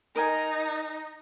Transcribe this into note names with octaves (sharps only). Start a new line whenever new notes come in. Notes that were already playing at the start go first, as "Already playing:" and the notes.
D#4 A#4 D#5 G#5